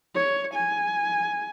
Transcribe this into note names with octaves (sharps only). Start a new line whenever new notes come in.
C#5
G#5